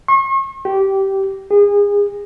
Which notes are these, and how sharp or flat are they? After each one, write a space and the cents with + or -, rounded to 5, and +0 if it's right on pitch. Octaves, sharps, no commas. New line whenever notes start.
C#6 -45
G4 -15
G#4 -30